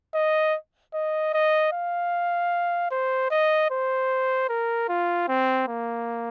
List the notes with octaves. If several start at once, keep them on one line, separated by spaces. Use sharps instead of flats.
D#5
D#5
D#5
F5
C5
D#5
C5
A#4
F4
C4
A#3